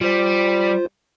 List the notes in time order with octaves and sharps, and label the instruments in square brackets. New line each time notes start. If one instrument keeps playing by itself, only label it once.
[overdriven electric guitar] G3 [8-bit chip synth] F4 C5